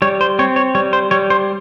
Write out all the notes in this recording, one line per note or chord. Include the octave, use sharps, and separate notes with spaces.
G3 C#5
C5
C4 C#5
C#5
G3 C#5
C5
G3 C#5
C5